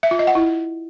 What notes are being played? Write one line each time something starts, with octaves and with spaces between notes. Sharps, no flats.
E5
F4
D#5
F#5
E4